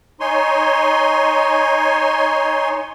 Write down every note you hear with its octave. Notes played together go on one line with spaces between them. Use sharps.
D#4 C#5 G#5 C6